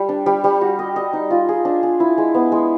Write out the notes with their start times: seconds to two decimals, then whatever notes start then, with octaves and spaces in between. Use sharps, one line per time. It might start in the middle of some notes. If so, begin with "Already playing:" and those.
Already playing: G3
0.09 D4
0.26 G3
0.44 G3
0.61 F#4
0.79 D#5
0.96 D#5
1.13 D#4
1.30 F4
1.49 G#4
1.65 D4
1.83 G#4
2.00 E4
2.18 G#3
2.34 B3
2.52 G#3